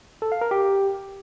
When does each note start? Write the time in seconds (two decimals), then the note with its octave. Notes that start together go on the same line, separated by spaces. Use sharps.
0.22 A4
0.32 F5
0.41 A#4
0.51 G4